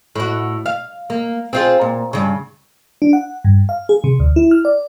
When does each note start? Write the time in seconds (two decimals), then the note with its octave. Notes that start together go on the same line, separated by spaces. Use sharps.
0.16 A2 F#4
0.66 F5
1.10 A#3
1.53 C4 F4 G#4
1.81 A#2
2.13 G2 C#3
3.02 D4
3.13 F#5
3.45 G2
3.69 F5
3.89 G#4
4.04 C3
4.20 D2
4.36 E4
4.51 F6
4.65 D5